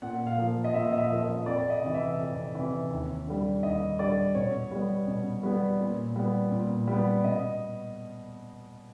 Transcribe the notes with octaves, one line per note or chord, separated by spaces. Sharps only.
A#2 F#5
F5
F3 A#3
D#5
A#2 E5
D#5
E5
F3 A#3
D#5
F2 D5
D#5
C3 E3
E5
F2
C3 E3
D#2
D3 G3
D#2 D#5
D3 G3 D5
B2 C#5
G3 B3
B2
G3 B3
A#2
G3 B3
A#2
G3 B3
B2 D#5